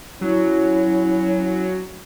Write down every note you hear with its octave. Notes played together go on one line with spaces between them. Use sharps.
F#3 C#4 E4